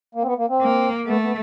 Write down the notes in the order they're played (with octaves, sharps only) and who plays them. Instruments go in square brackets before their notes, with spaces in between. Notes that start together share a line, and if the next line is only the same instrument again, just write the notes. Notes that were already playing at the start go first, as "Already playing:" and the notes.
[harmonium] A#3
C4
B3
A#3
C4
[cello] A#3
[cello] A3 [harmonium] B3
[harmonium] B3